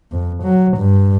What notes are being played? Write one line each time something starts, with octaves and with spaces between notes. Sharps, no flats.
F2
F#3
G2